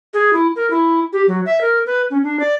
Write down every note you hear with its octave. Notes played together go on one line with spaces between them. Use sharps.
G#4
E4
A#4
E4
G4
F#3
E5
A#4
B4
C#4
D4
D5